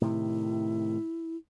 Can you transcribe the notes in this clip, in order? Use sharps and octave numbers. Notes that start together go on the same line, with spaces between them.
A2 C3 D#3 E4